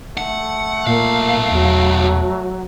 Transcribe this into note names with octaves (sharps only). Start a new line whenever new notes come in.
A3 F#5
B1 A#2 A#3 F5
E2 F#3